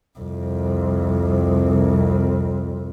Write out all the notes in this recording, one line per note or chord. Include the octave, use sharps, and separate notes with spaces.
C2 F2